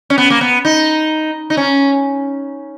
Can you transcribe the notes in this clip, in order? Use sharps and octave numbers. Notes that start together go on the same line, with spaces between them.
C#4
B3
A#3
B3
D#4
D#4
C#4